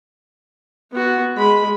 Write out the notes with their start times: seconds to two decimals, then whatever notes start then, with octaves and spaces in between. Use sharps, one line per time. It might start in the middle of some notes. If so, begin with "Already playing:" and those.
0.92 B3 F#4
1.36 G#3 B5